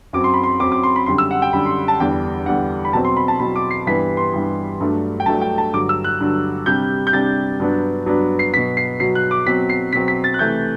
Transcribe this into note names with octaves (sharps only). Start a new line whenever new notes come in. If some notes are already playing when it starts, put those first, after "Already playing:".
F#2 F#3 C4 D6
C6
B5
C6
F#2 F#3 C4 D6
D6
C6
B5
F#2 D3 G3 C6
E6
F#5
G5
F#2 D3 G3 B5
C6
A5
E2 D3 G3 D4 G5
E2 D3 G3 D4 F#5
B5
B2 F#3 C4 A5
C6
B5
A5
B2 F#3 C4 B5
D6
C7
G2 E3 G3 B3 B6
C6
G2 E3 G3 B3
G2 F#3 A3 D4
G5
G2 F#3 A3 D4 A5
G5
A5
G2 D3 F#3 D6
E6
F#6
G2 D3 F#3
C3 G3 D4 G6
G6
C3 G3 D4 A6
G2 F#3 B3 D4
G2 F#3 B3 D4
C7
B2 F#3 B3 B6
C7
B2 F#3 B3 C7
F#6
D6
B2 F#3 C4 B6
C7
B2 F#3 C4 B6
B6
A6
F#6
C3 E3 A3 G6